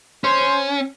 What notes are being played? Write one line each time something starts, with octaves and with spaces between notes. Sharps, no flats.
C#4 C5